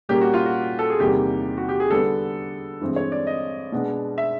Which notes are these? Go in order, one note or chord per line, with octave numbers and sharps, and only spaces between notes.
A#2 G3 A#3 C#4 G4
F#4
F4
F#4
A4
G#4
E2 C3 D#3 G3 A#3 G4
F#4
G4
G#4
D3 G3 B3 A4
G2 E3 G#3 C4
C#5
D5
D#5
B2 G#3 B3 D4
E5